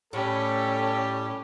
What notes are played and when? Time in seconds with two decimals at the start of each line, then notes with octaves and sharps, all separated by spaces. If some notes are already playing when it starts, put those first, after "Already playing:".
0.13 A2 G3 C#4 G4 A4